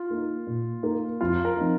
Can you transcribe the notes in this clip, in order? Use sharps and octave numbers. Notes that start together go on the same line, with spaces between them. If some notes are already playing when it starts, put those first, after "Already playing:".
Already playing: F4
A#3 D#4
A#2
A#3 D#4
F2 F4
A#4
F3 C4 D#4